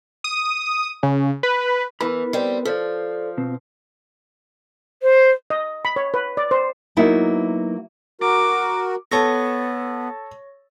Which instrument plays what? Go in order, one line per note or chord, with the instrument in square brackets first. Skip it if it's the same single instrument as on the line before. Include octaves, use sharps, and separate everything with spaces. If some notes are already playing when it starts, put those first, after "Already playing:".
[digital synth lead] D#6
C#3
B4
[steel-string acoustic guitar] E3 [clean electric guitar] B3 A#4 B5
[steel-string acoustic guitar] G3 C4
[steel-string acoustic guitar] F3 [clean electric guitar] A4 C5 D5
[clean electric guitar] B2 C4
[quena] C5
[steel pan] D#5
B5
C#5
B4
D5
C5
[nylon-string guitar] F#3 A#3 B3 D#4 E4
[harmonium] F#4 A#4 [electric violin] D6
[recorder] B3 [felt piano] A4 A5 [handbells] C#5 C#6 A#6